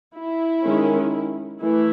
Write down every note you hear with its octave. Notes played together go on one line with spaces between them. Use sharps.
E4
D#3 G#3 C#4
E3 A3 E4